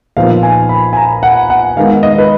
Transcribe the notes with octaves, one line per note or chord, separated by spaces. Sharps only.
A#2 F3 B3 D#4 F5
G#5
B5
G#5
A#5
F#5
F#5
D#3 G#3 B3 D#4 F5
D#5
B4